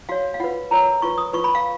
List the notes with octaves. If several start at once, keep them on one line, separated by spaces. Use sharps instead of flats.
F#4 C#5 F5
F5
F4 B4 F#5
F4 A#4 C#5 A#5
F4 B4 C#6
D#6
F4 B4 C#6
B5
F5